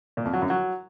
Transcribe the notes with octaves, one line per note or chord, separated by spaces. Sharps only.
A#2
F2
F#3
F#2
F#3